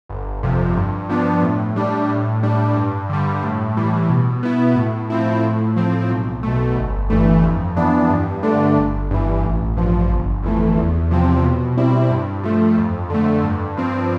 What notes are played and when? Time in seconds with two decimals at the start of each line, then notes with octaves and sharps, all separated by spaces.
0.09 G1
0.43 F2 C3 F3
0.77 G2
1.09 F3 B3 D4
1.43 A2
1.76 G3 D4
2.09 A2
2.43 G3 D4
2.76 G2
3.09 D3 G3
3.43 A2
3.77 E3 G3
4.10 B2
4.43 B3 E4
4.76 A2
5.10 F3 C4 E4
5.43 A2
5.76 F3 C4
6.10 B1
6.43 B2 A3
6.76 G1
7.10 G2 E3 A3
7.43 F2
7.76 E3 B3 D4
8.10 G2
8.43 D3 A3 D4
8.77 G1
9.11 G2 E3
9.43 A1
9.77 G2 F3
10.10 G1
10.43 F2 E3 A3
10.77 E2
11.11 C3 F3 C4
11.44 B2
11.77 G3 C4 E4
12.11 G2
12.43 F3 A3
12.78 F2
13.10 D3 A3
13.44 G2
13.77 F3 C4